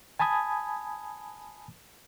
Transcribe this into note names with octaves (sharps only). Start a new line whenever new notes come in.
G#5 A5 B5 D#6 G#6